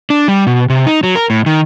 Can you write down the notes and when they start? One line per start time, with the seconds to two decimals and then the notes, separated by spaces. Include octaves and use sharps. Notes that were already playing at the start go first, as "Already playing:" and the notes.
0.10 D4
0.28 G3
0.47 B2
0.70 C3
0.87 D#4
1.03 F#3
1.16 A#4
1.30 A2
1.46 D#3